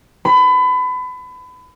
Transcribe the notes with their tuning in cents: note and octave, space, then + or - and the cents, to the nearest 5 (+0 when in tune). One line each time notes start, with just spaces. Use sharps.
B5 +30